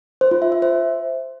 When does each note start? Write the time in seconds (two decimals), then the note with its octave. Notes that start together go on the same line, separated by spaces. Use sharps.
0.21 C5
0.31 F4
0.42 E5
0.52 E5
0.62 C5